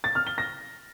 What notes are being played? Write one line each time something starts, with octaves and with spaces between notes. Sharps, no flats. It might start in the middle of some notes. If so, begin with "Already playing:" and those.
A6
F6
G7
A#6